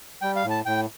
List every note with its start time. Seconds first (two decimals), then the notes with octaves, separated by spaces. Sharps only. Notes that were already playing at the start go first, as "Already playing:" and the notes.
0.22 G3 G5
0.36 F5
0.44 A2
0.50 A5
0.66 A2 G5